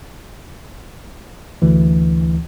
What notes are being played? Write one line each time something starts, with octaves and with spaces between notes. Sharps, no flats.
D2 E3